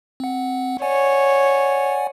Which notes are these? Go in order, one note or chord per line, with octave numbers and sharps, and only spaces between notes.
C4 F#5
C#5 D5 F#5 G#5